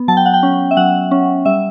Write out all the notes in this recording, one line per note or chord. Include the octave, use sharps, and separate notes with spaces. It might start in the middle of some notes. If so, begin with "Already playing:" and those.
Already playing: B3
F#3 A5
G5
F#5
G5
C#4
E5
F#3 F#5
C#4
G3 E5